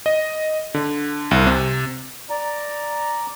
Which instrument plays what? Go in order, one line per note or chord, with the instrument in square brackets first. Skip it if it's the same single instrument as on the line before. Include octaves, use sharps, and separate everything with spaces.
[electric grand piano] D#5
D3
C2
C3
[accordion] D5 A#5